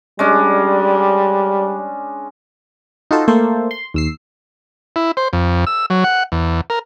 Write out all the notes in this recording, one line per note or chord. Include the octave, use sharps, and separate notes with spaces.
G3 G#3 C#4 D4
D#4 F4 F#4 A4 C5
A3 A#3 A4 C5
C6
D#2 E6 C7
E4
C5
F2
E6
F#3
F#5
E2
A#4